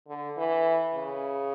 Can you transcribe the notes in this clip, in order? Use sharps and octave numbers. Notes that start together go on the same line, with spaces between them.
D3
E3
C#3